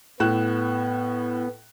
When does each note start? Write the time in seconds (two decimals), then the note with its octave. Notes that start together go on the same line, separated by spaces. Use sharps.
0.20 A2 B3 F#6 E7